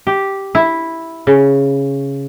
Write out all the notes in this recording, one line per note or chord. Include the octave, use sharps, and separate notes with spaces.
G4
E4
C#3